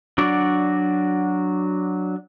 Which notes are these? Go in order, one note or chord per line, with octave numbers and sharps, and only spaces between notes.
F#3 D4 F#4 D5